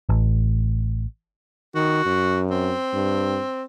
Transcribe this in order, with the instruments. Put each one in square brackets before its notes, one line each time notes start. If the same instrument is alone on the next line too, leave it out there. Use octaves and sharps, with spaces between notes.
[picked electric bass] A1
[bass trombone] D#3 [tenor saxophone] F#4
[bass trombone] F#2
[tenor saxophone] C4
[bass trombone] G2